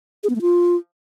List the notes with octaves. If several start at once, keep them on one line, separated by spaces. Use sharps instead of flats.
G#4
B3
A3
F4